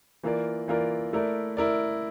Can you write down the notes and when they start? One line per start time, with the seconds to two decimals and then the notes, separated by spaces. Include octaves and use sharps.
0.23 E3 A#3 F4 A#4 D5
0.68 E3 A#3 F4 A#4 D5
1.13 A3 E4 A#4 D5
1.57 E4 A#4 D5